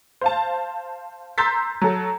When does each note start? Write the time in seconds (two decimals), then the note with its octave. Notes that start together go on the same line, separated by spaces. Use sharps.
0.21 C5 F5 A5
1.38 A#5 C6 E6 G6 A6 B6
1.81 F#3 A4